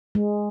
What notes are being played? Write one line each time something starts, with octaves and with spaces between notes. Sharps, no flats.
G#3